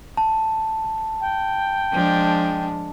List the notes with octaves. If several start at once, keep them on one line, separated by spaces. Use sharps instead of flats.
A5
G5
F3 G#3 D4